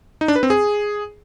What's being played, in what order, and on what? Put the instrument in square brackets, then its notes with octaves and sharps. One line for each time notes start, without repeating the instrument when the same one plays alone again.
[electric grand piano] D#4
D4
B4
C4
G#4